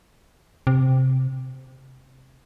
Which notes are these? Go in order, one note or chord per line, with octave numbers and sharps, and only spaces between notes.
C3